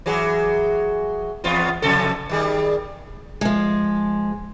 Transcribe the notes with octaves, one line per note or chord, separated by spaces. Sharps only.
E3 F#3 G#4
E2 B3 F4
F2 C3 A4
D#3 G3 G#4
F3 G#3